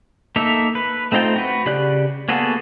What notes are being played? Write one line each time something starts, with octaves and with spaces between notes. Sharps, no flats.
A#3 D#4 A4 E5
B4
A3 C4 D#4 F4 G5
F#4 B4
C#3 G4 D5 F#6
A#3 B3 F#4 G#4 A4